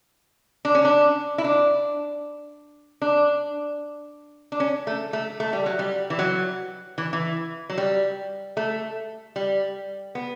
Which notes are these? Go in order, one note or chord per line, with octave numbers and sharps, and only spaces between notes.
D4
C#4
D4
E4
D4
D4
D4
C#4
A3
A3
A3
G3
F#3
G3
E3
F#3
E3
E3
F#3
G3
A3
G3
B3